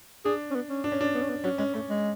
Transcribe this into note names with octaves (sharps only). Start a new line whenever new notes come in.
D4 G#4
C#4
B3
C#4
D4
C#4
D4
B3
C#4
B3
F#3 C#4
G#3 C#4
A3 C#4
G#3